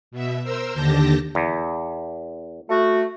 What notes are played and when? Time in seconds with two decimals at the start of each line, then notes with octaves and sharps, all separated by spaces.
0.11 B2 E5
0.42 A#4 C5 E6
0.74 D#2 D3 G4 G5 A5 A#6
1.35 E2
2.69 A3 F#4